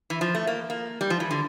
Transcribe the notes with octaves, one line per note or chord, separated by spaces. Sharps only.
E3
F3
A3
A#3
A#3
G3
F3
E3
D3